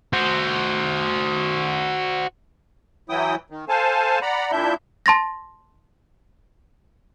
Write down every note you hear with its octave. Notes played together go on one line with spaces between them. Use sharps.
F#4 C5
E3 F#3 E4 G5 D#6
D#3
A4 C5 F5 G#5 A5
D5 F#5 A#5 B5
A#2 D4 E4 E5 G6
A5 C6 A6 A#6